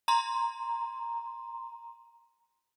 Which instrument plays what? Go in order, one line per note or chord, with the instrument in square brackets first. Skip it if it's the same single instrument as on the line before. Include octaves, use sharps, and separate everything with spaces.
[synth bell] A#5 C6